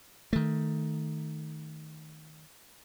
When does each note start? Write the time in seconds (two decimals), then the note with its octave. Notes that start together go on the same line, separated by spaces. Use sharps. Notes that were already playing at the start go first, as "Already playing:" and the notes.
0.33 D#3 A3